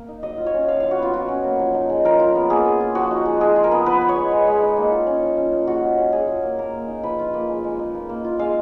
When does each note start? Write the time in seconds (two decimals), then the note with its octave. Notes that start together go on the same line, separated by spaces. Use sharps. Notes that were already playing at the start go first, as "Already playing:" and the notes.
Already playing: A#3
0.09 D#4
0.23 F#3 D#5
0.38 F4
0.46 C#5
0.54 C#4
0.68 F3 F5
0.80 F4 F5
0.91 F#4
0.99 B3 F4
1.14 F#3 F#4
1.29 C#4
1.44 A#3
1.59 F3
1.74 D#4
1.90 G#3
2.05 F3 A#4
2.19 F4
2.35 B3
2.50 A#3 G#4
2.65 A#3
2.80 F4
2.95 F3 F#4
3.11 D#4
3.26 G#3
3.41 F3 G#4
3.56 F4
3.64 A#4
3.72 B3
3.86 F3 B4
4.01 B3
4.09 C#5
4.16 G#3
4.31 G#3
4.47 G#3
4.62 D#4
4.77 A#3
4.92 F4
5.07 C#4
5.23 F3
5.37 C#4
5.53 A#3
5.67 G#3 F#4
5.82 F4
5.98 C#4
6.13 F#3 G#4
6.28 F4
6.43 A#3
6.59 A#3 A#4
6.74 A#3
6.88 D#4
7.03 F3 B4
7.19 F4
7.34 A#3
7.49 G#3
7.64 G#3
7.79 D#4
7.94 A#3
8.09 A#3
8.24 F4
8.39 G#3 F5